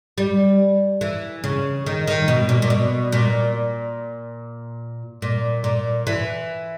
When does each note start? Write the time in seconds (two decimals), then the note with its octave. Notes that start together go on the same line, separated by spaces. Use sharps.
0.18 G3
1.01 E3
1.44 C#3
1.86 D#3
2.07 D#3
2.28 B2
2.49 A#2
2.62 A#2
2.70 B2
3.12 A#2
5.22 A#2
5.64 A#2
6.07 E3